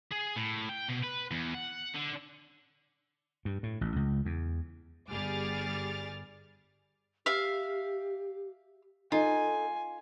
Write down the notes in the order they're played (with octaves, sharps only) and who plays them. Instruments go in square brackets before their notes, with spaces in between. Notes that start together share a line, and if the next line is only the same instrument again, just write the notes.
[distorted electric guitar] G#4
A2
G5
B2
B4
E2
F#5
D3
[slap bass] G2
A2
A1
C#2
E2
[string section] G1 G3 G#4 D6 F6 A6
[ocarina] G4 [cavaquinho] E5 F5
[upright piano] D#4 [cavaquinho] F4 [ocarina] A4 [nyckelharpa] G#5